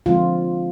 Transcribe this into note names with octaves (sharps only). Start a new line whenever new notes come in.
D3 F3 G#3 C4 F4